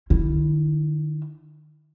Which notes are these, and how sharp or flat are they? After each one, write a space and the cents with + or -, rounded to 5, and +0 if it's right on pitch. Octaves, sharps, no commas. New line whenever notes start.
D#3 -40 E4 +0